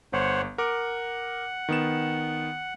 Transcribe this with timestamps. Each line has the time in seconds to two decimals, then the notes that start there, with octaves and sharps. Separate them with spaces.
0.13 G1 C5 C#5 F#5
0.58 A#4 F#5 D6
1.69 D#3 B3 E7